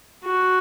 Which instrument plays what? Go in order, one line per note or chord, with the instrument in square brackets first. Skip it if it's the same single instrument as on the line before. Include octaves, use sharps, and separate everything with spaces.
[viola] F#4